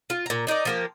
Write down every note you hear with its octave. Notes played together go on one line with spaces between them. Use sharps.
F4
A#2 A#5
D4 D#4 A#4 D5
F3 A#3 G4